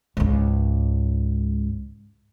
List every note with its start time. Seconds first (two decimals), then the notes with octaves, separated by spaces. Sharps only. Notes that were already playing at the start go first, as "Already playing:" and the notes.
0.17 C#2 G#2